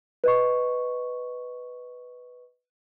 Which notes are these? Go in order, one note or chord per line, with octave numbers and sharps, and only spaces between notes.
B4 D#5 C#6